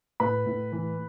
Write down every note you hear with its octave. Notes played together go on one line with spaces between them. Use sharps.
A2 B4 B5
A2
E3